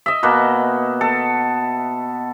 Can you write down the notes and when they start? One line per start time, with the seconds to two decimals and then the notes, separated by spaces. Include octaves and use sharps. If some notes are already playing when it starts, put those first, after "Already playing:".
0.06 D#5 E5
0.23 B2 A#3 F#4
1.01 A4